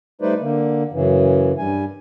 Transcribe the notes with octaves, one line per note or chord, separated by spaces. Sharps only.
G3 A3 D#4 B4 C5 D5
D3 A#3
F#2 C#3 E3
G2 G3 G#5